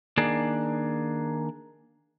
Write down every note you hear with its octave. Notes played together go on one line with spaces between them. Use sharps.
D#3 A#3 D4 G#4